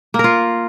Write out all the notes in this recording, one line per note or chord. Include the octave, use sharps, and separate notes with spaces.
A#3
A#4
F4